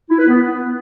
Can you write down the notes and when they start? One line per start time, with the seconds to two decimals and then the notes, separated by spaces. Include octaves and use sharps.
0.09 E4
0.19 B4
0.28 B3